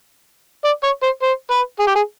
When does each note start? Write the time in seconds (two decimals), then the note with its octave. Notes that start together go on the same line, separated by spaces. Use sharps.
0.64 D5
0.83 C#5
1.03 C5
1.22 C5
1.51 B4
1.79 G#4
1.87 G4
1.95 G#4